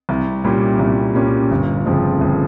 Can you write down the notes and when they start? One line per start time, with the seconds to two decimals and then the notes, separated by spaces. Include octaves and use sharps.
0.09 C2
0.44 A#2 G3 C#4
0.79 C2
1.15 A#2 G3 C#4
1.51 G1
1.86 F2 C#3 F3 C4
2.21 G1